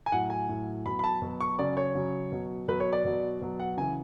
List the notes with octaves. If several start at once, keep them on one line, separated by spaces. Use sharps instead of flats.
G#5
A2 F#3 F#5
G#5
A2 F#3
B2 F#3 B5
B5
A5
B2 F#3
C#6
C#3 F#3 D5
C#5
C#3 F#3
B2 F#3
B2 F#3 B4
C#5
D5
B2 F#3
B2 F#3
F#5
C#3 E3 G#5